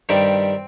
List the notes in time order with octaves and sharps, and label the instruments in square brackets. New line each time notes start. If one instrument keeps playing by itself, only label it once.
[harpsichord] G2 D#3 G3 C4